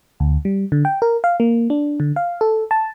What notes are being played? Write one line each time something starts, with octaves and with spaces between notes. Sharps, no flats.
D2
G3
D3
G5
A#4
F5
A#3
D4
D3
F5
A4
A5